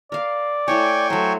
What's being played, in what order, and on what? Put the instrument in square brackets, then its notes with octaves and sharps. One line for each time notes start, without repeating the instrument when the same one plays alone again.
[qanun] A#4 F5 [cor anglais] D5
[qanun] A3 E4 C#5 [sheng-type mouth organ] G5 G#5 C#6
[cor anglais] F#3 [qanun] A3 C5